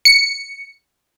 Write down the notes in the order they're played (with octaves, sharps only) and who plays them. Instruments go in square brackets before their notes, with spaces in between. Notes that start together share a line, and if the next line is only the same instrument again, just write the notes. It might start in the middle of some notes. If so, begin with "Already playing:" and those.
[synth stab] C#7